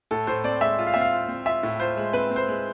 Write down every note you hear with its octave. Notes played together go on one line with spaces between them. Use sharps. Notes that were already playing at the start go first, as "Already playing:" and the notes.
A2 A4
A2 C5
C4 D5
G#3 E5
F4
F5
C4 E5
F5
F4
C4
F4 E5
A2
F4 C5
G#3
C4 B4
C4
C5
G#3